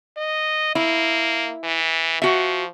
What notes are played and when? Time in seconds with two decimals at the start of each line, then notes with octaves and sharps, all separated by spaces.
0.17 D#5
0.75 A#3 E4
1.64 E3
2.22 F3 F#4 E5